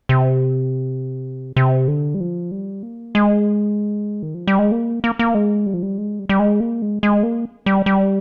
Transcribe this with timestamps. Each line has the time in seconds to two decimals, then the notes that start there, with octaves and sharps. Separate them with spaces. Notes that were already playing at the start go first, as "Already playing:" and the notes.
0.09 C3
1.57 C3
1.88 D3
2.14 G3
2.20 F3
2.51 G3
2.83 A#3
3.15 G#3
4.23 D#3
4.34 F3
4.47 G3
4.59 G#3
4.72 A#3
5.04 A#3
5.19 A#3
5.35 G#3
5.66 G3
5.74 F3
5.83 G3
5.98 G#3
6.19 G3
6.29 G3
6.39 G#3
6.60 A#3
6.82 G#3
7.03 G#3
7.23 A#3
7.66 G3
7.86 G3